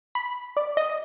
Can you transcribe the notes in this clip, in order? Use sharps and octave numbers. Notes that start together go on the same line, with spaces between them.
B5
D5
D#5